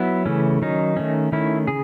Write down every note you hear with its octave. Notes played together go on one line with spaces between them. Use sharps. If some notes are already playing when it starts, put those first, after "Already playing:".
Already playing: F#3 B3 E4
C#3 E3 A3 C#4
D#3 F#3 C#4 D#4
D#3 A3 C#4
D#3 A3 C#4 E4
C#3 G#4